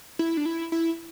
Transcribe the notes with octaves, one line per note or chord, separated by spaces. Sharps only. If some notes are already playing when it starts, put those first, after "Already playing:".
E4
D4
E4
E4